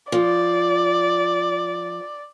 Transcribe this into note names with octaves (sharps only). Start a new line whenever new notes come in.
F3 D5